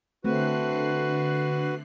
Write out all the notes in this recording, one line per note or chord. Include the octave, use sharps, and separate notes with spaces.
D3 A3 C4 F#4 B4 F#6 C7